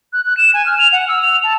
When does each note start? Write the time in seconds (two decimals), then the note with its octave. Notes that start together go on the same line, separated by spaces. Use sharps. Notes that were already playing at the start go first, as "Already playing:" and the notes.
0.13 F#6
0.26 F#6
0.37 E7
0.54 G#5
0.66 F6
0.78 F7
0.92 F#5
1.08 E6
1.23 F7
1.44 A5